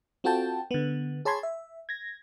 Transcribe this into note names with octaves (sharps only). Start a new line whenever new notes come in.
C4 F4 F#4 A4 G5 A5
D3 B3
G#4 C#5 A5 B5 C6 G#6
E5
G#6 A#6